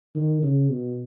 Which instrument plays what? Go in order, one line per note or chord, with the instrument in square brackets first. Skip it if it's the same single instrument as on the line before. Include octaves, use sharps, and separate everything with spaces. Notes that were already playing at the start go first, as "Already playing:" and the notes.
[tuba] D#3
C#3
B2